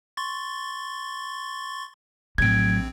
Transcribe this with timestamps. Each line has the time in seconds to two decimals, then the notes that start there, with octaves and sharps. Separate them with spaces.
0.17 C6 C#6 A6
2.38 A#1 A2 F#3 C4 G#6 D7